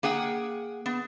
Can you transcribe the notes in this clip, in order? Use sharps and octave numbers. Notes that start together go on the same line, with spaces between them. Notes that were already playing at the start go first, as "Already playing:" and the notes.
A#3 G#4 F#5 G5
B3